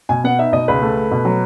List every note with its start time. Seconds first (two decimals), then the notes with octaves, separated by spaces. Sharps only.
0.09 B2 G#5
0.24 B3 F#5
0.39 D#4 E5
0.52 B2 D#5
0.68 C#2 B4
0.82 A3
0.97 A3
1.11 B2
1.25 F#3